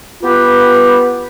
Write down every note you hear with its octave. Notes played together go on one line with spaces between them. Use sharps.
B3 F4 G4 B4